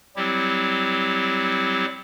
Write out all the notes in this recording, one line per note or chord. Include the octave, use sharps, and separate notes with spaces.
F#3 G3 C4 E4 G4